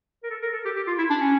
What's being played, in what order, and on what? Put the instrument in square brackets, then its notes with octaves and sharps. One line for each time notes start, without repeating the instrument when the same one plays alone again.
[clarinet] A#4
A4
A#4
A4
G4
G4
F4
E4
D4
C#4